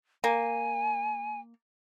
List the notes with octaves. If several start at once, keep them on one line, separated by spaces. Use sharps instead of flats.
A#3 G#5